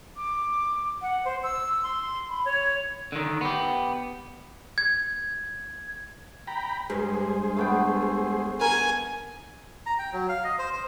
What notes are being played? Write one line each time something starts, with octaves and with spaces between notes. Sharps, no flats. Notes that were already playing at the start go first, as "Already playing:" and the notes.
D6
F#5
C5
E6
C6
B5
C#5
D3 D#3
B3 G4
G#6
G5 A#5 B5
G2 G#3 G#4 C5
A3 B3 G5
A#4 G#5
A#5
G5
F#3
F5
D#5
C5
C5